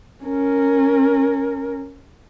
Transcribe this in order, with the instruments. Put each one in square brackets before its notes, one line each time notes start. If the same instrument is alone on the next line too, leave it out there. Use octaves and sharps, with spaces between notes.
[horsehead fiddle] C#4 A#4